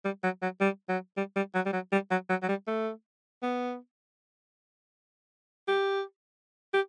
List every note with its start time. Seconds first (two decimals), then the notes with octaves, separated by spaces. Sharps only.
0.05 G3
0.24 F#3
0.42 F#3
0.61 G3
0.89 F#3
1.17 G3
1.36 G3
1.55 F#3
1.66 G3
1.73 F#3
1.92 G3
2.11 F#3
2.30 F#3
2.43 F#3
2.49 G3
2.67 A3
3.43 B3
5.68 G4
6.74 G4